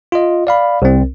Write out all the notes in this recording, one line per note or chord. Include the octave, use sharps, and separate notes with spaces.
F4 D#5
D5 F5 B5
C2 C4